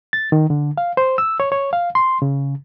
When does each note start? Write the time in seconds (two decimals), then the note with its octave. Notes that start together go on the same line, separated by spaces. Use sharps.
0.13 A6
0.32 D#3
0.50 D3
0.78 F5
0.97 C5
1.18 E6
1.40 C#5
1.52 C#5
1.73 F5
1.95 C6
2.22 C#3